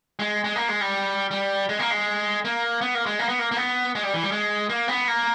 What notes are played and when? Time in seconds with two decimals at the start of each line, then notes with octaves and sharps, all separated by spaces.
0.19 G#3
0.44 G#3
0.56 A#3
0.69 G#3
0.81 G3
1.31 G3
1.69 G#3
1.79 A#3
1.91 G#3
2.45 A#3
2.81 B3
2.95 A#3
3.06 G#3
3.19 A#3
3.29 B3
3.39 A#3
3.51 A#3
3.57 B3
3.95 G#3
4.03 G3
4.14 E3
4.23 G3
4.31 G#3
4.69 A#3
4.88 B3
5.08 A#3